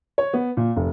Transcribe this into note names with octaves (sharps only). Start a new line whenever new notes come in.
C#5
B3
A#2
F1